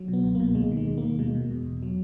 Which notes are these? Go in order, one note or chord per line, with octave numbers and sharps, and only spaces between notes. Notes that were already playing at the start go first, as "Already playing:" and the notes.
Already playing: F#3
B2
B3
C#2
A#3
B2
D#2 G#3
D#3
G#3
D#2
A#3
D#3
B2 G#3
B2
E2
E2
F#3